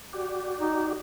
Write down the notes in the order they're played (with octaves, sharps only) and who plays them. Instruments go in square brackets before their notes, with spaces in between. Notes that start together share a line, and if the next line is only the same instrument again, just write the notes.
[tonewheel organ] F#4 G4 D5
[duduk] D#4